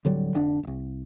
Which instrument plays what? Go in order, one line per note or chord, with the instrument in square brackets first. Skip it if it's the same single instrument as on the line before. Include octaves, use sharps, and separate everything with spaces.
[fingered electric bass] D1 D3 F#3 G3
F1 D3 D4
D1 C2